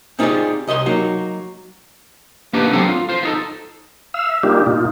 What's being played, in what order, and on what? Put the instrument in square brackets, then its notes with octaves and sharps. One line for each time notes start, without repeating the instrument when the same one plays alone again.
[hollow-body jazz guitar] C4 D#4 F4 G4 G#4 D5
C2 D#5 B5 C6
F#3 A#3 D#4 F#4
[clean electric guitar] A#3 B3 D4 D#4 G4 B4
F#3 C4 D4 A4 C5 F#5
F4
F4 C5
B3 D#4 A4
[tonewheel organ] F5 E6
E5
G3 A#3 D4 D#4 F4 G4
A#2 D#4 F4